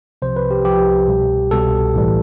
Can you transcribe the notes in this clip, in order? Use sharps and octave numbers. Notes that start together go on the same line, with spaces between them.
C2 C3 F3 C5
B4
G4
C2 C3 F3 G4
C2 B2 G3
C2 B2 G3 A4
A1 A2 E3 G3